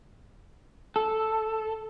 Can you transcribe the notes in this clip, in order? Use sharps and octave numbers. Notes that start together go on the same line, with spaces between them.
A4